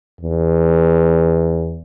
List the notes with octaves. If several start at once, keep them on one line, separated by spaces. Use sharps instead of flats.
E2